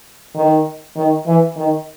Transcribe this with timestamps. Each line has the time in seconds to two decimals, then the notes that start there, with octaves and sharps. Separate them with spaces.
0.35 D#3
0.97 D#3
1.27 E3
1.57 D#3